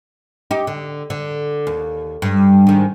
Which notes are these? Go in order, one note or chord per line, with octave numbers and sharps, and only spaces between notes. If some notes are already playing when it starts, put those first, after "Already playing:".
D#4 G4
D3
D3
D#2
G2
G#2 D#3